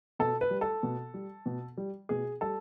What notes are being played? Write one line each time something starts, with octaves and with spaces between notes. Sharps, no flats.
B2 A4
B4
G3
A4
B2
G3
B2
G3
B2 G#4
G3 A4